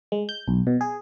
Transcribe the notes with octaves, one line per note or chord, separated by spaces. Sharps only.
G#3
G6
B1
B2
G#4